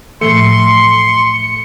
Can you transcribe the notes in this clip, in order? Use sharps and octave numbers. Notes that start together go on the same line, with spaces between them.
A2 E3 F3 A3 C6 C#7